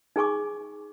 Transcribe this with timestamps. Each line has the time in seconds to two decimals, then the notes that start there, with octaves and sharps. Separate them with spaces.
0.16 D#4 G#4 G#5 C#6 D6